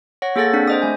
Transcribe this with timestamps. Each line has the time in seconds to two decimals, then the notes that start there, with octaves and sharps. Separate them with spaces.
0.22 C#5 F#5 A#6
0.36 A#3 G#4 A4 F#5 A6 A#6
0.53 C4 D4 B6
0.67 C5 D#5 D#6
0.82 A3 G#5